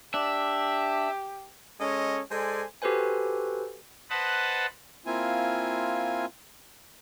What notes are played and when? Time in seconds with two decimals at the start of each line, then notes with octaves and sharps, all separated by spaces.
0.14 D4 G4 E5
1.80 G#3 C#4 A4 C#5 D#5
2.31 G#3 A4 C5 D5 G#5
2.82 F#4 G4 A4 B4 C5 G#5
4.10 B4 C5 D#5 F#5 A5 B5
5.06 A#3 C4 E4 F4 G#5